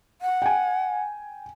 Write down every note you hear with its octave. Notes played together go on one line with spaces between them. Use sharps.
F#5
G5 G#5